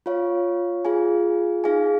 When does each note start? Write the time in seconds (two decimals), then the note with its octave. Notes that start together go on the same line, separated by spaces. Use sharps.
0.06 F4 C#5 F5
0.85 F4 G#4 F5 G#5
1.64 D#4 G#4 F5 G#5